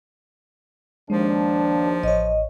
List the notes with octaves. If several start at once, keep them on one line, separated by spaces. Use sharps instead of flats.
D#2 F3 G#3 D4
A1 C#5 D#5